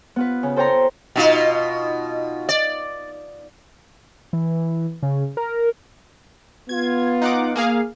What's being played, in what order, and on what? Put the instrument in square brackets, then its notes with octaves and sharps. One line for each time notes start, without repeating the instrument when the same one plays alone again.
[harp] B3 F4 B4
C#3
A4 C5 C#5 G5 A#5 C6
[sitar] B2 D#4 F4
D5
[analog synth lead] E3
C#3
A#4
[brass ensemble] B3 F4 [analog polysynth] G#6
[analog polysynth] D#4 F#5 D6
A#3 G#4 F5